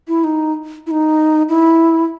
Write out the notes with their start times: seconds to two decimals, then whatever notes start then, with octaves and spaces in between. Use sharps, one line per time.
0.08 E4
0.24 D#4
0.87 E4
0.91 D#4
1.49 E4